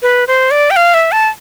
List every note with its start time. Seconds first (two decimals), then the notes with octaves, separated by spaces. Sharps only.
0.02 B4
0.28 C5
0.51 D5
0.71 G5
0.76 F5
0.94 E5
1.12 A5